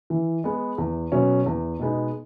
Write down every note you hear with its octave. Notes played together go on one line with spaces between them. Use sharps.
E3
G#3 B3
E2
B2 F#3 C#4
E2
B2 G#3 B3 D#4